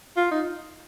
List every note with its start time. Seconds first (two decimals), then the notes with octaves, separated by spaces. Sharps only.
0.17 F4
0.31 D#4